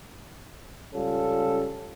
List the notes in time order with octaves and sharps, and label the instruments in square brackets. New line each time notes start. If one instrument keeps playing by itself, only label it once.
[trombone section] C#2 G3 C#4 F4 A4